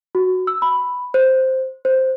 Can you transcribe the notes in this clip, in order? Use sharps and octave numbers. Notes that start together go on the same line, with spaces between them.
F#4
E6
B5
C5
C5